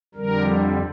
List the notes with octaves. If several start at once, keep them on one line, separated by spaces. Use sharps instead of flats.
F2 D3 G3 A#4